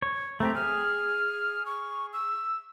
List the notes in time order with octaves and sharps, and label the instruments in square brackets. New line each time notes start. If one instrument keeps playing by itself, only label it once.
[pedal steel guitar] C#5
[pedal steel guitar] A3 C4 G4 [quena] A#5
[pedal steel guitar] G#4 [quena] F6
[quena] C#6
E6